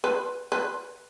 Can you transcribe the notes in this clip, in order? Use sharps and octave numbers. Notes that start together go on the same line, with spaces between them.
B4
B4